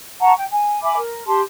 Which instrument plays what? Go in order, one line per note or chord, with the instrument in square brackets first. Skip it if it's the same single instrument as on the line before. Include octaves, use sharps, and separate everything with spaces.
[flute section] F#5 A5 A#5 C#6
G5
G#5
E5 G#5 B5 D6
A#4
G4 A5 C6